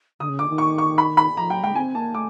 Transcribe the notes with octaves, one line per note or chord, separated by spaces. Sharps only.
D3 D#6
C#3
D3 D6
D#3
C#6
C#6
B5
B5
F3 A#5
F#3 G5
G#3 G5
C4 G#5
A#3 A5
A3 D6